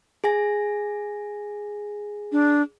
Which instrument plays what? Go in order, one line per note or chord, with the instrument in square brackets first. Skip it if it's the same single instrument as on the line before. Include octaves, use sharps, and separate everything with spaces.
[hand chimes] G#4 G#5 A#6
[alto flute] D4